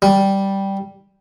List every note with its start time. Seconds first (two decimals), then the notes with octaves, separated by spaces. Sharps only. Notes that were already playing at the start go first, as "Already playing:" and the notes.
0.02 G3